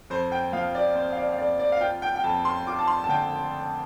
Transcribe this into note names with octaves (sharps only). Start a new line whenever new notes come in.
F2 C5
G5
F3 F5
D5
C4 C5
F5
D5
F5
F2 D5
D5
F5
F4 G5
G5
G5
F2 A5
C6
F4 D6
A5
C6
A5
D3 G5